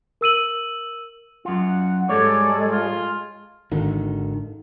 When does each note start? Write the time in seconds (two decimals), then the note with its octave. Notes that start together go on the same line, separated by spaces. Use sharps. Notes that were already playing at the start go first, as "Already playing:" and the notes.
0.21 A#4 E6 D#7 F#7
1.45 F#2 F4 F#5
2.09 G#2 G3 G#3 A4 C#5 D5 G#6
2.71 F4
3.71 G#1 D3 D#3